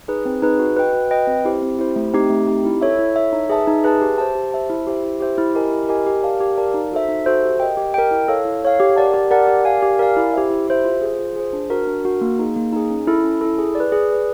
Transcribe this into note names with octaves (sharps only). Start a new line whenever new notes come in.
D#4 G#4 B4
C4
D#4 G#4 B4
F#4
B4 D#5 G5
F#4
B4 D#5 G5
C4
E4 G4 C5
C4
E4 G4 C5
A3
C4 D#4 G4
A3
C4 D#4 G4
E4
A4 C#5 E5
E4
A4 C#5 E5
D#4
G#4 B4 E5 A5
D#4
G#4 B4 E5 A5
G4
C5 E5 A5
G4
C5 E5 A5
E4
G4 C5 E5
E4
G4 C5 E5
E4
G4 A#4 D#5 G#5
E4
G4 A#4 D#5 G#5
G4
A#4 D5 F5 A5
G4
A#4 D5 F5 A5
D#4
F#4 A4 C5 E5
D#4
F#4 A4 C5 E5
G4
A#4 D#5 G5
G4
A#4 D#5 G5
E4
A4 C#5 F5
E4
A4 C#5 F5
G4
A#4 D5 F#5 A5
G4
A#4 D5 F#5 A5
G4
A#4 D5 F5 G#5
G4
A#4 D5 F5 G#5
E4
G4 C5 E5
E4
G4 C5 E5
F4
G#4 C5
F4
G#4 C5
D4
F#4 A#4
D4
F#4 A#4
A#3
D#4 G#4
A#3
D#4 G#4
C#4
E4 A4
C#4
E4 A4
G#4
D5
B4
G#4
B4 D5